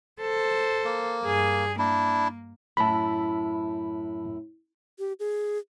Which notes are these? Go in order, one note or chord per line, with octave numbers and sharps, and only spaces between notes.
A4 C5
A#3
G2 G#4
A#3 D4 E4
F#2 A2 E4 A5 B5
G4
G#4